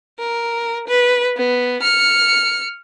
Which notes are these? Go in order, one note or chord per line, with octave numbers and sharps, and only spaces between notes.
A#4
B4
B3
F6 C#7